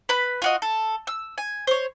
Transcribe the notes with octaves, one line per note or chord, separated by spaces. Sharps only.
B4 B5
F4 F#4 D#5
A4
E6
G#5
C5 C#5